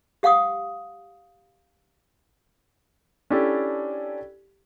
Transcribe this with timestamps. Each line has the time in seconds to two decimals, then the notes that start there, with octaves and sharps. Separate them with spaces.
0.23 G4 F5 F#5 C#6 D#6
3.30 C#4 D4 E4 G4 A4 D5